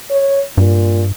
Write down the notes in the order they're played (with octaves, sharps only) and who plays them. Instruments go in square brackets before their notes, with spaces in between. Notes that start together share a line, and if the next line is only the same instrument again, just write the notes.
[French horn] C#5
[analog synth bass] G2 [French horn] A#2